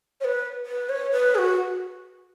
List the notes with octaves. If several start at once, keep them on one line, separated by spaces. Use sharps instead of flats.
C#5
B4
B4
C#5
B4
G#4
F#4